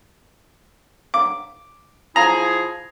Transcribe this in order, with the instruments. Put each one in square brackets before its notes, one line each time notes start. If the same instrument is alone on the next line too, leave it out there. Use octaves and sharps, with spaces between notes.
[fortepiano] D6
[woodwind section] F3 E4 G#4 [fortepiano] A#5